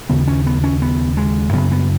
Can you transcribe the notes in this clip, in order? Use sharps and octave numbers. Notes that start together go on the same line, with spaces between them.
D#2 C#3 B3
C#4
B3
C#4
B3
G#3
F#2 C#3 B3
B3